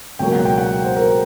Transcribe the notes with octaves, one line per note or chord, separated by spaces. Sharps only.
C#2 B2 F#3 A#3 G5
F#5
G5
F#5
C5
A#4